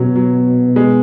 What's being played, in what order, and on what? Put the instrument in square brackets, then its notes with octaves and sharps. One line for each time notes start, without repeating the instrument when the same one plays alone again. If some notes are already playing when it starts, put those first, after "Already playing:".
Already playing: [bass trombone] B2 [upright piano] F#3 C#4
[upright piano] F#3
G#3